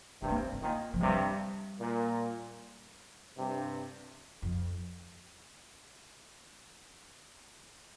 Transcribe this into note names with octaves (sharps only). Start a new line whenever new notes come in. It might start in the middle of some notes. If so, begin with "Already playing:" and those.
G2 C3 C4
A#3
C4
C4
A#2 D#3 A#3
F3
G2 C3 G3
A#2
G2 C3
F2